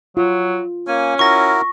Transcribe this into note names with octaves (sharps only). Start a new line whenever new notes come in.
F#3 F4
A#3 C#4 G#5
E4 F#4 A#4 C#6 A#6